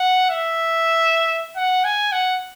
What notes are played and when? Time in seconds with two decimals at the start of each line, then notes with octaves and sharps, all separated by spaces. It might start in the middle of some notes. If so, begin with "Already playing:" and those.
Already playing: F#5
0.30 E5
1.56 F#5
1.84 G#5
2.12 F#5